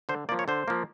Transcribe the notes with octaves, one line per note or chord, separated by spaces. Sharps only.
D3 C5
F3 A#3 D5
C#5
D3 C5
F3 A#3